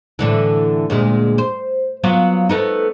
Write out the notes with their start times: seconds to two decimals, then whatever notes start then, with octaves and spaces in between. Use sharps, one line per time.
0.19 A2 D3 E3
0.90 D2 A#2 G#3
1.38 C5
2.04 F#3 B3 F4
2.49 A3 B3 D#4